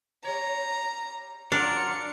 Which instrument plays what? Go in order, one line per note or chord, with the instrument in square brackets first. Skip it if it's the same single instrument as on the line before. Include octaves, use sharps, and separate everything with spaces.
[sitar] G3 C#5 [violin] A#5
[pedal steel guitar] F#3 A#4 [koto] D4 [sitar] F4 G4 D5 [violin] C#7